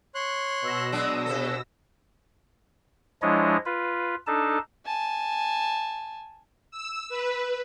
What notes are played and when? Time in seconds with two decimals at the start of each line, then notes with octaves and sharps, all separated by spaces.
0.15 C#5 C6 F#6
0.62 B2 E6 A#6
0.92 F#3 G#3 D4 D#6
1.26 C3 A4
3.22 F3 G#3 D4 E4 C#5 D#5
3.66 F4 B4
4.27 D4 D#4 A4 A5
4.86 G#5 A5
6.71 E6
7.09 B4